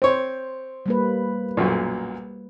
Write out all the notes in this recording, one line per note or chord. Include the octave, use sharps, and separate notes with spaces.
C4 C5 C#5
G3 A#3 B4
B1 F#2 A#2